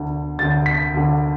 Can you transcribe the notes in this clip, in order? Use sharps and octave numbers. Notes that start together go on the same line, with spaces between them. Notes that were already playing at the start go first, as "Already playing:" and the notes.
Already playing: D2 D3
D2 D3 A6
B6
D2 D3